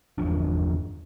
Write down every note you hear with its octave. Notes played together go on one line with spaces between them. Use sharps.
G1 E2 F3 D4